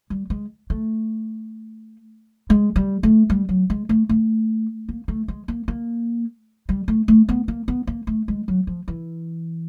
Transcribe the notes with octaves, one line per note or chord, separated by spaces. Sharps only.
G3
G#3
A3
G#3
G3
A3
G3
F#3
G#3
A3
A3
A#3
A3
G#3
A#3
A#3
G3
A3
A3
B3
A#3
B3
A#3
A3
G#3
F#3
F3
E3